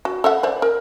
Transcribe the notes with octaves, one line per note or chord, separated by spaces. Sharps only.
F#4
A4 E5 F#5
C5 D5
A#4